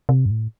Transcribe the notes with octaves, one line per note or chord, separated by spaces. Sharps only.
C3
G2
A2